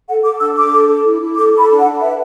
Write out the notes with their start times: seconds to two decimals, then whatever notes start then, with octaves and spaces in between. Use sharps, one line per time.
0.08 A4 F#5
0.24 A4 D6
0.40 D4 E6
0.56 D4 D6
0.73 A4
0.89 A4
1.05 E4
1.21 E4
1.37 A4 D6
1.53 A4
1.59 B5
1.69 D4
1.80 F#5
1.85 D4
2.01 B4 E5